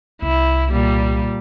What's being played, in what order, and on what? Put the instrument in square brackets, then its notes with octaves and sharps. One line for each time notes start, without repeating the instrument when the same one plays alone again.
[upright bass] C2 [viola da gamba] E4
[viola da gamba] A#2 G3